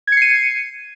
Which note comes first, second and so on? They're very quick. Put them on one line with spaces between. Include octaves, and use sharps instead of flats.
G#6 C#7 C7 D#7